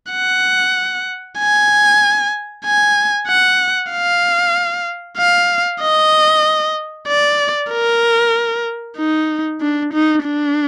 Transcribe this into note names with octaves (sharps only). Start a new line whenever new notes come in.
F#5
G#5
G#5
F#5
F5
F5
D#5
D5
A#4
D#4
D4
D#4
D4